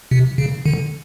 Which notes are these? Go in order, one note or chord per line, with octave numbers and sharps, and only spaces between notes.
C3
C#3
D3